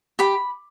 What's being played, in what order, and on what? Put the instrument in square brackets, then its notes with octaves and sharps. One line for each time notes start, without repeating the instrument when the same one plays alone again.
[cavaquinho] G4 B5